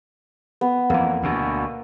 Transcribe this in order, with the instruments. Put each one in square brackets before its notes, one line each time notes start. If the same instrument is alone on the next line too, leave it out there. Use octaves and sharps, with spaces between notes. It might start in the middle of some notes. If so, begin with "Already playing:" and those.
[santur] B3
[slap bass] F2 E3 [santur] A#3
[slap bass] D2 B2